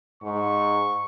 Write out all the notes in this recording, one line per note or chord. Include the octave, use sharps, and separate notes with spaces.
G#2 C#6